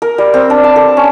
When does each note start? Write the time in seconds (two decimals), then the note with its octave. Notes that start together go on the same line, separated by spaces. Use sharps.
0.02 A#4
0.18 G3
0.34 C4
0.50 D4
0.64 A5
0.76 A4
0.97 C#4